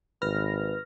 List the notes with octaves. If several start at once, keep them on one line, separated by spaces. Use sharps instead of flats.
G#1 B4 F6 A#6